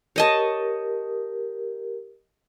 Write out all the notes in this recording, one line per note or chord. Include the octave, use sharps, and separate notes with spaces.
G4 A#4 C#5 D#5 A5